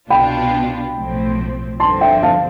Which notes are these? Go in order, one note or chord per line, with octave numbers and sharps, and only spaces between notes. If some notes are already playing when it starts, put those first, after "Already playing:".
C2 B2 B3 D4 F4 G5 B5
B1 A2 F3 C4
G1 G2 D3 F3 C4 A5 C6
E5 G5
F5 A5